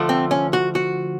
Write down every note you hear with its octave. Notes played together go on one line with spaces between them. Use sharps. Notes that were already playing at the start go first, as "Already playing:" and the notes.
Already playing: D3 F3 A3
C4
C#4
F#4
F#4